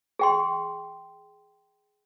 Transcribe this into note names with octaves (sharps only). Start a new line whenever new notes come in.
G#4 G5 C6